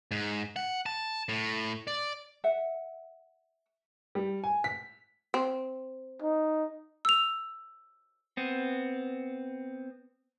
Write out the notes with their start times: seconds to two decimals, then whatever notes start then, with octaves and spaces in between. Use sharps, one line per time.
0.11 G#2
0.56 F#5
0.86 A5
1.29 A2
1.87 D5
2.44 E5 F#5
4.15 G3
4.44 G#5
4.64 B6
5.34 C4
6.22 D#4
7.05 E6 F7
8.37 B3 C4